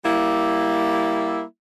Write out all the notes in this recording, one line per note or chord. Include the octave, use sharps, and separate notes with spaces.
G3 A#3 E4